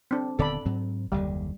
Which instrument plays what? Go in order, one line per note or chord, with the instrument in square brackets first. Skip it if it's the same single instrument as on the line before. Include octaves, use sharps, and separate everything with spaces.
[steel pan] C4 D4
[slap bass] D#1 D3 B3 [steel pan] A4 D5 B5
[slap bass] G#2 F#3 C4
[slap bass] F#1 D#2 D3 [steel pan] G3